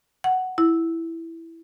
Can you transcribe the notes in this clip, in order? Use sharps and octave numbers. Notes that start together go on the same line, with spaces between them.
F#5
E4